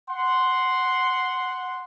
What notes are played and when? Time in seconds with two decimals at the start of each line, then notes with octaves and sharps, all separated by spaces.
0.10 F#5 C6